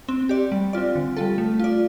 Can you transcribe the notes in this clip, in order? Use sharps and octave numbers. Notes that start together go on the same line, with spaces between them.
C4
G4 D5
G3
C4 F4 D5
D3
G3 F4 A4
A3
F4 D5